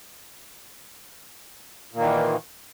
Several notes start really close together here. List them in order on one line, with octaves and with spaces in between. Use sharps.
A#2 A#3 D#3 E3